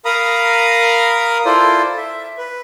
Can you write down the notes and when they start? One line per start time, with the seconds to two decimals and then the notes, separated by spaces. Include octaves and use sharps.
0.05 A#4 F5 A#5 B5 D#6
1.45 E4 F4 A4 C5 D5
1.98 E5
2.38 B4